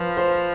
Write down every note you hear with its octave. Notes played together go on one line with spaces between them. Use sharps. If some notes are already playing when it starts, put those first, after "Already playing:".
Already playing: F3 B4
C5